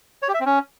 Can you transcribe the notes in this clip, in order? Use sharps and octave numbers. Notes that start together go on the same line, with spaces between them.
C#5
G4
E5
C4
C#4